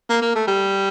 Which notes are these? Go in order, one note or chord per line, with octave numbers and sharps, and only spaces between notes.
A#3
A#3
A3
G3